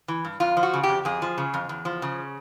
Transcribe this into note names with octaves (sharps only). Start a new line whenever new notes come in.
E3
G2
F2 F4
F3
F#4
C#3
G4
F2
F2 G#4
F3
C#3
F2
E2
F3
C#3